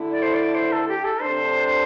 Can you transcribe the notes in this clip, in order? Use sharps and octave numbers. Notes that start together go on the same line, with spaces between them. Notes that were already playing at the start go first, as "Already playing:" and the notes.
Already playing: D3 A3 E4
D5
C5
D5
C5
A4
G4
A4
C3 A3 D4 C5